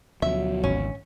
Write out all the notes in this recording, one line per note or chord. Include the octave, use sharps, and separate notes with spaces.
D2 B2 F3 F#3 E5
G#1 C#4